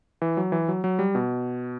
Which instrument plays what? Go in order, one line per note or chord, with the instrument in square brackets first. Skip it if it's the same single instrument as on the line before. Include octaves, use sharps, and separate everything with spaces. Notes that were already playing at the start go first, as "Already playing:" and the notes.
[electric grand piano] E3
F#3
E3
F#3
F#3
G3
B2